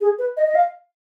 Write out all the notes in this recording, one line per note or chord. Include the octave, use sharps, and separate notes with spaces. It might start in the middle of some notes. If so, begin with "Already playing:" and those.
G#4
B4
D#5
D#5
F5